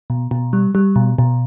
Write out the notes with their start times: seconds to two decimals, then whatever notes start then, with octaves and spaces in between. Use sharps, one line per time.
0.10 B2
0.31 B2
0.53 G3
0.75 G3
0.96 B2
1.19 B2